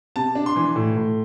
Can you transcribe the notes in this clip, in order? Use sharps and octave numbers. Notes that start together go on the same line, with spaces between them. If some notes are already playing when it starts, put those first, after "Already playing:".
C3 A5
D4
C6
E3
A2
A2